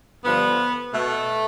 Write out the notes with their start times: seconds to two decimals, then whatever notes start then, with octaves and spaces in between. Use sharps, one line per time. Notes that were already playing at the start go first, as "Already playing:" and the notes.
0.25 G2 D3 F3 B3
0.93 B2 A3